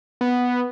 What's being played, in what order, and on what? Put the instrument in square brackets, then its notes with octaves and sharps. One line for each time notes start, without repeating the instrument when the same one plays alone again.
[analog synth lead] B3